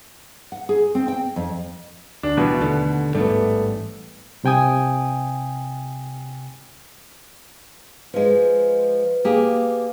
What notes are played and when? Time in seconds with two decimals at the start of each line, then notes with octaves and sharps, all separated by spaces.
0.52 F#5
0.69 G#4
0.95 C4
1.08 G5
1.36 F2
2.23 D2 D4
2.37 B2 E3 G3
2.60 D#2 D3 A3
3.15 A1 G#2 G3 A3 B3
4.43 C2 C3 G5 G#5 D#6
8.14 F3 G#3 B4
9.25 A#3 G4 G#4